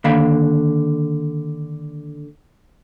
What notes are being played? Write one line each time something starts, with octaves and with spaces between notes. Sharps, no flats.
D3 D#3 A#3 F5 B5